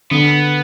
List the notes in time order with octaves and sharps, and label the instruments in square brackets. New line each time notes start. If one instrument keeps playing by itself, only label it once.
[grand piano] D3 [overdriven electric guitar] B3